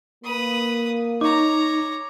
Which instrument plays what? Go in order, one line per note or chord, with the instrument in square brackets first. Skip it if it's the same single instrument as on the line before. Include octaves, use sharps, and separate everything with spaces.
[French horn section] A#3 [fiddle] B4 D#6
[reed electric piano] D#4 [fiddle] C#5 A#5 [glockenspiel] D6